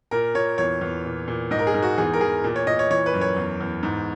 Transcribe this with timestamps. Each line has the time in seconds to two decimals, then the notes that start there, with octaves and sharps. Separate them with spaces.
0.11 A#2 A#4
0.35 A#2 C#5
0.58 E2 C#5
0.81 E2
1.05 A#2
1.28 A#2
1.51 G#2 D#5
1.59 A#4
1.67 G#4
1.74 G#2
1.82 F#4
1.98 E2 G#4
2.14 A#4
2.21 E2 G#4
2.44 A#2
2.56 C#5
2.67 A#2 D#5
2.79 C#5
2.90 E3 C#5
3.06 B4
3.14 F#2
3.21 C#5
3.37 E2
3.61 E2
3.83 G#2